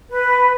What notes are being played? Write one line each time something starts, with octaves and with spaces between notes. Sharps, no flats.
B4